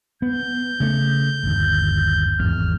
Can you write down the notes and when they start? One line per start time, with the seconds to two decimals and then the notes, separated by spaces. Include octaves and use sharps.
0.22 B3 G6
0.80 C#3 A3
1.43 G1 D#2
2.39 G#1 E2 F6